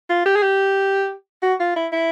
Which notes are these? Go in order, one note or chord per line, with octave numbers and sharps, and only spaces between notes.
F4
G4
G#4
G4
F#4
F4
E4
E4